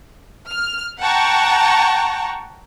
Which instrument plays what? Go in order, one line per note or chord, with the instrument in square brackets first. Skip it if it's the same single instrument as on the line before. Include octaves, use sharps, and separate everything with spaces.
[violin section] F6
F#5 G5 A5 A#5 C#6